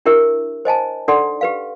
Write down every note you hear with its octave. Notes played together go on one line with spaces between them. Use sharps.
D4 E4 G4 A#4 E5
C5 D#5 G#5 A5
D4 D#4 A4 D5 F#5 C6
G4 B4 F5